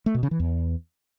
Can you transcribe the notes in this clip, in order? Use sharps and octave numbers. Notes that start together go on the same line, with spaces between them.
A3
B2
C#3
E3
E2